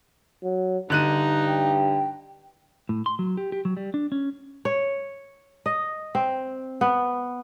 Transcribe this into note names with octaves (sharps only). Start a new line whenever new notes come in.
F#3
G2 D3 D#4 F#6 D#7
G5
A2
C6
F#3
G4
G4
F#3
G3
D4
C#4
C#5
D#5
C4
B3